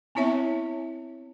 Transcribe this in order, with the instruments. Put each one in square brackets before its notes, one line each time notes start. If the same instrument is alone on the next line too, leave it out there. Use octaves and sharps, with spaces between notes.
[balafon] B3 C4 E4 C#5 E5